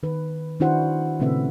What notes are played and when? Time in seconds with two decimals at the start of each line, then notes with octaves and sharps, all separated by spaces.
0.03 D#3 B4
0.60 D#3 D4 E4 F#4 C5 F#5
1.20 A#2 C#3 A3 C4 B4 E5